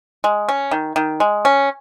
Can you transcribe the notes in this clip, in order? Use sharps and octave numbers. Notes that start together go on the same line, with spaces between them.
G#3
C#4
D#3
D#3
G#3
C#4